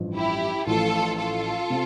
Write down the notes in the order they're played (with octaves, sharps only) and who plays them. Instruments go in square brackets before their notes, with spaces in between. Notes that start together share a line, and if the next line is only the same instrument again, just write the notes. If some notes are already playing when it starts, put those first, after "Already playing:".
Already playing: [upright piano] A1 G2 F3
[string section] E4 G4
[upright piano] A1 A2 F3 [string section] F4 A4
[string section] F4 A4
[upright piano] C3